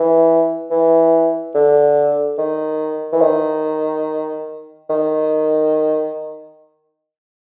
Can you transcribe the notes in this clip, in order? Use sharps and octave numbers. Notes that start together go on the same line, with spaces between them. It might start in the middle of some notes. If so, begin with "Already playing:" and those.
Already playing: E3
E3
D3
D#3
E3
D#3
D#3